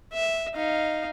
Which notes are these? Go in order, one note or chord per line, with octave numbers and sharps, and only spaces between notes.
E5
D#4 F5